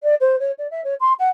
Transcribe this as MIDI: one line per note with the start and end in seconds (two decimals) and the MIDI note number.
0.03 0.14 74
0.20 0.38 72
0.39 0.51 73
0.58 0.67 74
0.71 0.81 76
0.84 0.94 73
1.00 1.13 84
1.19 1.29 78